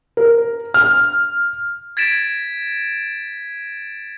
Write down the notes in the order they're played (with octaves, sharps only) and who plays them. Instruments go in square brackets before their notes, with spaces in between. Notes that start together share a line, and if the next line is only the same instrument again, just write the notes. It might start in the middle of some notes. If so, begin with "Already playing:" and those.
[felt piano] A#4
F6
[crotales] G#6 A6 B6 D7 E7